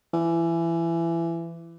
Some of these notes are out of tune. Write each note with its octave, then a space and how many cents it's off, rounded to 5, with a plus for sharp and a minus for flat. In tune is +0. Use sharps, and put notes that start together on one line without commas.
E3 +25